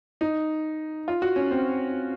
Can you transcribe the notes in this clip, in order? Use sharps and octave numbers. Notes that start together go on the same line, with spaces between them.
D#4
F4
F#4
C#4
C4